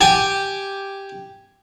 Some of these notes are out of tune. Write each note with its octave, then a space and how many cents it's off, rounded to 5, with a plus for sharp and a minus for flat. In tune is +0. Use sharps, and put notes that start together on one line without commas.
G4 +0 G#5 +0